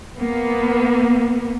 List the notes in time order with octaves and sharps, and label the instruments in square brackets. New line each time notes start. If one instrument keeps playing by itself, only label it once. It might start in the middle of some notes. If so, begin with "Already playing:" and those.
[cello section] A#3 B3